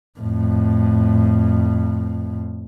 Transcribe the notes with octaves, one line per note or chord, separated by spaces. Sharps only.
F2 A2